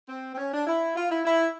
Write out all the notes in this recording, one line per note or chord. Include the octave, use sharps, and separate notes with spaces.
C4
C4
C#4
D4
E4
F4
E4
E4